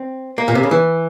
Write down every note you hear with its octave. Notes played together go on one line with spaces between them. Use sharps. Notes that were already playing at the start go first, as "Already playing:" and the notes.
Already playing: C4
A#3
A#2
C3
C#3
E3